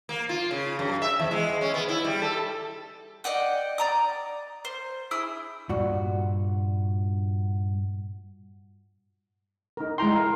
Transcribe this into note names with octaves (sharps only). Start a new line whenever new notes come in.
A#3
F4
C#3
F#2
E5
E2
G#3
C#4
B3
E4
G3
A4
D5 D#5 F#5 G5
D5 A#5 D#6
C5
E4 G#4 D#6 E6
G2 A#2 F#4
D#4 A#4
G#3 E4 G5 A#5 C6
A#4 F5